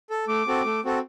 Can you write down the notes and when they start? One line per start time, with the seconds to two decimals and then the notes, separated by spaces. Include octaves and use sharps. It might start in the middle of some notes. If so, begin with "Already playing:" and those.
0.10 A4
0.28 A3 D6
0.47 C4 F#4 A4
0.65 A3
0.85 C4 F#4 A4